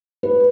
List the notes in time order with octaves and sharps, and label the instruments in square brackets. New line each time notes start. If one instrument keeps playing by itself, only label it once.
[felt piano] B4